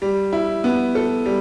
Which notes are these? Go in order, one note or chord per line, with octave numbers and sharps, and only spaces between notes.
G3
E4
B3
A4
G3